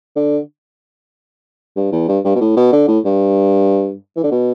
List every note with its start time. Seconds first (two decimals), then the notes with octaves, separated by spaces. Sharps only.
0.16 D3
1.76 G2
1.92 E2
2.08 G2
2.24 G2
2.36 B2
2.41 A2
2.57 B2
2.72 D3
2.88 A2
3.05 G2
4.16 E3
4.24 D3
4.32 B2